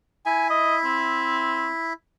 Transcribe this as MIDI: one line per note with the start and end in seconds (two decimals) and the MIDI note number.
0.26 1.93 64
0.26 1.93 76
0.26 0.46 80
0.50 0.76 75
0.85 1.69 60